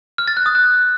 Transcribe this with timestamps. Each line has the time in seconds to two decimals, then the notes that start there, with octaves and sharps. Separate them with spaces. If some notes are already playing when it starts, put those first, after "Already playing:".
0.18 F6
0.28 A6
0.37 F#6
0.46 D#6
0.55 F#6